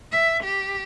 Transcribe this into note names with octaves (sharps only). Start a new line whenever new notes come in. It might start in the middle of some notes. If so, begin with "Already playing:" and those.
E5
G4